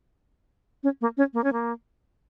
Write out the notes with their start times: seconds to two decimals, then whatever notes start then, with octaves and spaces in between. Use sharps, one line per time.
0.83 C#4
1.01 A#3
1.17 C#4
1.34 A#3
1.44 C#4
1.53 A#3